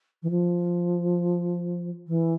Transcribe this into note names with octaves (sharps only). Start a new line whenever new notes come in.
E3
F3
E3